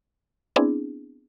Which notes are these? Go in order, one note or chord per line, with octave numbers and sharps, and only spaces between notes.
B3 C4 D4 E4 G#4